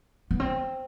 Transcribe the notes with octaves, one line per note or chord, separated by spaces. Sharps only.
B3
C4